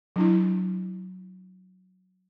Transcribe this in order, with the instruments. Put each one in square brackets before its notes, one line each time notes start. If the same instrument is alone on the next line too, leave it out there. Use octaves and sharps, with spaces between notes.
[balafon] F#3 D4 E4